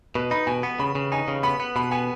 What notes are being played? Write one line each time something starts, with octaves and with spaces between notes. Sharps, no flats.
B2 B4
D#4 B5
B2 G#5
B3
C#3 B5
C#3
D#4 G#5
C#3
B3 B5
B3
B2 B5
B3 G#5